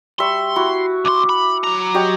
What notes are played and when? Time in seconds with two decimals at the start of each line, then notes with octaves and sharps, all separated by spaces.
0.19 G3 E5 C6 C#6
0.56 E4 F#4
1.05 C#2 C6 D6
1.29 B5
1.63 F#3 A#5
1.94 F#4 G4 D#5